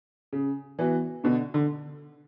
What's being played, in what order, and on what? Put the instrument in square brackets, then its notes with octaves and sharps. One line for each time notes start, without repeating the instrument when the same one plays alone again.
[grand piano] C#3
E3 B3 F#4
[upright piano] B2 [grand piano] D3
[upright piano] D3